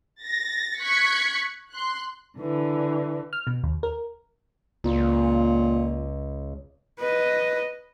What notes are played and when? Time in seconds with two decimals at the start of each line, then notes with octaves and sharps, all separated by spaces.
0.23 A6 A#6
0.79 C#6 F#6 G#6 B6 C#7
1.71 C6 F#6
2.38 D3 E3
3.33 F6
3.47 B2
3.64 D#2
3.83 A#4
4.84 C#2 A#2
6.99 B4 D#5